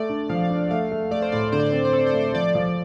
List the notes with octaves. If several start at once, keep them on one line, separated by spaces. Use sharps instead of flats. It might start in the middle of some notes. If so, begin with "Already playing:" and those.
Already playing: A3 D5
D4
F3 F5
F5
D4
A3 F5
A3
A3 D5
C5
A2 D5
D3 C5
D5
C5
C4
C5
C4 A4
C5
A3
C5
F3 D5
F3